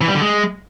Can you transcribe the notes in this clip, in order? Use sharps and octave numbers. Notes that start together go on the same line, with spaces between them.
E3
G3
D3
G#3